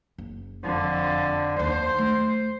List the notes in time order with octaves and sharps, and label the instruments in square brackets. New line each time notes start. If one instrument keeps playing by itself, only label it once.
[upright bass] F#1
[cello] F2 D3
[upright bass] D#2 [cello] C5
[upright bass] A3